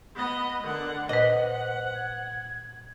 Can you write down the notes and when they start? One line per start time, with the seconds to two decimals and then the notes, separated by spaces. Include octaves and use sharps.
0.15 B3 D#5
0.64 D3 A#4 F#5
1.09 A#2 B4 C5 D#5 F#5
1.94 G#6